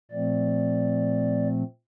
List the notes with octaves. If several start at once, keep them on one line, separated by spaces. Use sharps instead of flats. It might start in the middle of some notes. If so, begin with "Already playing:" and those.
A#2 F3 A3 C4 D5